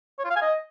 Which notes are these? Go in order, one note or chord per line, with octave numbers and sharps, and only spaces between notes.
C#5
F4
F5
G#5
D#5